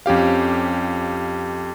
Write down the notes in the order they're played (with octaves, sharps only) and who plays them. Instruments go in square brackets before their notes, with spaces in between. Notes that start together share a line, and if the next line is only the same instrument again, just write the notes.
[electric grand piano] F2 C#4 G4 F5